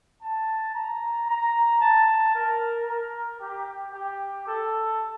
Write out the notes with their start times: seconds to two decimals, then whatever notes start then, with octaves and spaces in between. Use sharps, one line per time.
0.23 A5
0.75 A#5
1.28 A#5
1.81 A5
2.34 A#4
2.87 A#4
3.40 G4
3.93 G4
4.46 A4